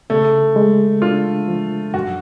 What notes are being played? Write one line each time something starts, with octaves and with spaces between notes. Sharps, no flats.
C#3 A3
G#3
D4 F4
F3
F#2 F#4